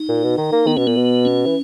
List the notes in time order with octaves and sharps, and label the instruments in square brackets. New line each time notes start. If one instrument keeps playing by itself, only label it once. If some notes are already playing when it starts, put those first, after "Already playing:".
Already playing: [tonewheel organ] D#4
[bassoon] A#2
B2
D#3
A#3
[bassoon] D#3 [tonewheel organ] B3
[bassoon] B2 [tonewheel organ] C#4
[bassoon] A#2 [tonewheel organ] B3
[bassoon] B2
[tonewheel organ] C#4
[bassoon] E3